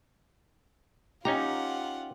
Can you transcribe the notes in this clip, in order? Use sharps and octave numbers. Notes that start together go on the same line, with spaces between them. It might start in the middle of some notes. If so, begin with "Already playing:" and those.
C#4 D#4 F4 G4 F#5 A#5